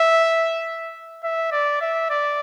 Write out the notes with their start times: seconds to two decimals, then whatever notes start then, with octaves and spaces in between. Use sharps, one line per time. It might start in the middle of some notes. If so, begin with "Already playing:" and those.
Already playing: E5
1.23 E5
1.52 D5
1.81 E5
2.10 D5